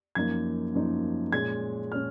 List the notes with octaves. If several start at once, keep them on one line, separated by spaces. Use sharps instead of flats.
F#2 F3 A#3 D#4 G#6
F#2 F3 A#3 D#4
A#2 G#3 C#4 G#6
A#2 G#3 C#4 F6